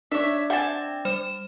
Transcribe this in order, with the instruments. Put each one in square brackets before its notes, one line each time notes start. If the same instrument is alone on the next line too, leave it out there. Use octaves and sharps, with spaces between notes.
[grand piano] D4 [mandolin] C#5 E5
[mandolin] C4 G#5 A5 [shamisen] E5 F#5
[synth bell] G3 C5 E7